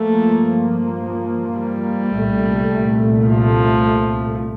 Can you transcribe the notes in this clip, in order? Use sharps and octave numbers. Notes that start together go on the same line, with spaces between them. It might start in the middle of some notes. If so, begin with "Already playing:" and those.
Already playing: G2 F3 A3 A#3
G3
C2 A#2 A3
F3